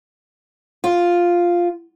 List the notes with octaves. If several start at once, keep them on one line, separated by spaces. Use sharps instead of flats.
F4